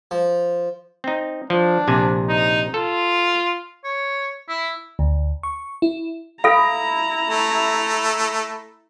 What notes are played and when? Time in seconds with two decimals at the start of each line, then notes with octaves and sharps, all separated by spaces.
0.11 F3
1.04 C4 D#4
1.50 F3 D4
1.88 A#1 C3 G#5
2.29 D#4
2.74 F4 A4
3.84 C#5
4.49 E4
4.99 D2
5.43 C#6
5.82 E4
6.44 E4 A4 F5 A#5 B5 A#6
7.26 A3